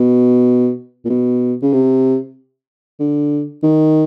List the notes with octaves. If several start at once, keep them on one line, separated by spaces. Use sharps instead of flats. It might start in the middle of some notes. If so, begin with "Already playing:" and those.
Already playing: B2
A#2
B2
C#3
C3
D3
D#3